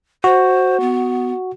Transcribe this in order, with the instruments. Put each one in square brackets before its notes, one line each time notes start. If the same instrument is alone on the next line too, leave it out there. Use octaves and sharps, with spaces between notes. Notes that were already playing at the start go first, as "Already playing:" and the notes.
[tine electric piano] F#4 [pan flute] C5
[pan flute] B3